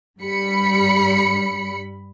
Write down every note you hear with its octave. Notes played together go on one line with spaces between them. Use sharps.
G2 G3 B5 C#7